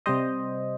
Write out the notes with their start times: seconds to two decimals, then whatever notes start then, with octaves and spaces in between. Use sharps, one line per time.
0.06 C3 G3 C5 D#5